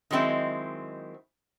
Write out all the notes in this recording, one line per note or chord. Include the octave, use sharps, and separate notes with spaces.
D#3 F#3 G#3 C4 E4